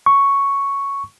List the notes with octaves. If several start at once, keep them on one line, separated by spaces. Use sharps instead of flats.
C#6